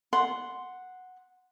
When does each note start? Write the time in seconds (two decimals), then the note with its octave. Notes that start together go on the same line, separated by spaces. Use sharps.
0.13 F#5 C6